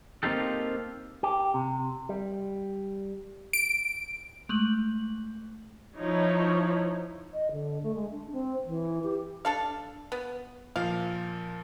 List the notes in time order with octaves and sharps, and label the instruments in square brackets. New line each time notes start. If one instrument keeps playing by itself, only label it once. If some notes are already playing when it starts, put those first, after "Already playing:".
[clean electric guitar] A#3 C4 D#4 F4 G4 A4
G4
C3
G3
[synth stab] D7
[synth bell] G#3 A3 F#7
[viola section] F3 D#4 E4 C#5
[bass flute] D#5
D3
A3
G#3
D4
C4
E3
G4
[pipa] D4 A4 F5
B3
[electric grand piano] A#2 F3 [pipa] F5